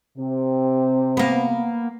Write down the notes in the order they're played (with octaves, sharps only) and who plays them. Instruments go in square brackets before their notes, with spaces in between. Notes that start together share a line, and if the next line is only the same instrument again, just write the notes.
[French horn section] C3 C4
[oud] A#3 B3